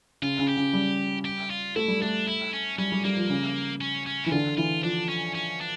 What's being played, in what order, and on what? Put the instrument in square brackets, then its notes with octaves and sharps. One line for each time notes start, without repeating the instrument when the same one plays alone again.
[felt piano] C#3 [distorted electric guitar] F4
[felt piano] C#3
[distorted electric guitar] G4
[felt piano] C#3
G3
[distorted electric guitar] G4
F4
[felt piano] A3 [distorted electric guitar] E4
[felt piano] G3
[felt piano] A3 [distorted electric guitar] D4
[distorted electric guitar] E4
C#4
[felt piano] G3 [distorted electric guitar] C#4
[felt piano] G3
[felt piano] G3 [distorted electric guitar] A#3
[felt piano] F3
C#3
[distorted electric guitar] C#4
C#4
[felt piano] E3 [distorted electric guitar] E4
[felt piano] D3 [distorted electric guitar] F4
[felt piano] E3 [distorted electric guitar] F4
[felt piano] F3 [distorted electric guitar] D4
[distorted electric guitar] C#4
C#4
D4